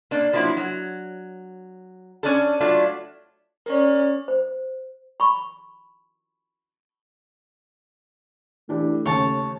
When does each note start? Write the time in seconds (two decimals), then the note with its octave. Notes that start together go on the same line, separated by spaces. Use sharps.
0.11 A#3 D4
0.33 F3 F#3 A#3 E4
0.57 F#3
2.23 C#4 D4 A4
2.60 F#3 A3 D4 F4
3.66 C#4 A#4 D5
4.28 C5
5.20 B5 C#6
8.69 E3 A3 D4 G4
9.06 D#2 C#3 C#5 A5